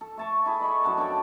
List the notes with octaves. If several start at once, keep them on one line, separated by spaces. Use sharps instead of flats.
A4
A3 A5 C#6
E4 G#4 A4
D5 D#5 B5 C#6
F#2 A4 F#5 A5
D4 A4 C#5 G5